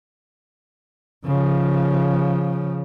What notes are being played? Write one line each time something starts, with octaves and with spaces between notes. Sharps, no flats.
C#3 F3